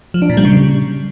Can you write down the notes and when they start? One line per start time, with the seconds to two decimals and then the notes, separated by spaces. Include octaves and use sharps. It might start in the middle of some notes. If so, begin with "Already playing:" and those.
0.14 F3
0.22 D4
0.30 A#2
0.37 G3
0.45 C#3